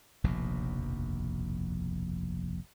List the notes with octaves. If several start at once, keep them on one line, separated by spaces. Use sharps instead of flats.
F1 A#1 D#2 B2